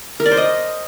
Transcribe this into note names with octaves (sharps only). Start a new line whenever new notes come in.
A#4
D5
C5
D#5